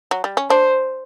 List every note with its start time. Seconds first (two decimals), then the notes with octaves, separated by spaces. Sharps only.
0.11 F#3
0.24 G3
0.37 C#4
0.50 D4 C5